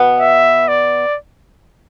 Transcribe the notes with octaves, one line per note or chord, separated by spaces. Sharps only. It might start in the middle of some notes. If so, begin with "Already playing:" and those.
Already playing: B2 B3
E5
D5